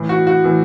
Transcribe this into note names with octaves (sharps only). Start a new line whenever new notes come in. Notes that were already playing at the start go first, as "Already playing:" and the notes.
Already playing: A2 E3
F#4
F#4
A2 E3